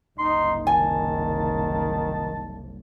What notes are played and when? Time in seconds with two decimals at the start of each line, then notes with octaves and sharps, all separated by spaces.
0.19 F#1 C2 D#4 C6
0.67 D#3 G#5 A5